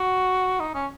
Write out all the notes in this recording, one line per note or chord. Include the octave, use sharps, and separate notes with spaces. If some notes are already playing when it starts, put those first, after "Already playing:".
Already playing: F#4
D#4
C#4